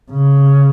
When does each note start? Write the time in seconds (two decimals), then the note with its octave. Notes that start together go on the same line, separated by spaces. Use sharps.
0.11 C#3